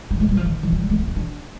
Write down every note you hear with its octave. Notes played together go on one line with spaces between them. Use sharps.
D4
A3
G3
F3
D#3
D#3
F3
G3
A3
A#3
C4
D4